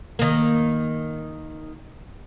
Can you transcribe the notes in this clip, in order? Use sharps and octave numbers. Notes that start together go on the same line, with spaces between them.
D#3 A#3